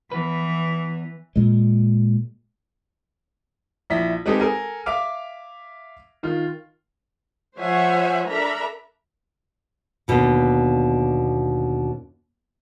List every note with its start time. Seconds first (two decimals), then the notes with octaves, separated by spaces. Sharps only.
0.12 E2 E3 B3 B4
1.36 A#2 G#3
3.90 A#1 E4 B6
4.26 G#3 C4 D#4 G4 A4 B4
4.40 A4 A#4 G#5
4.86 E5 F5 D6 F6
6.23 D#3 F4
7.59 F3 C5 C#5 E5 F#5 G#5
8.29 D4 A4 A#4 E5 A#5 B5
10.08 D#2 B2 D3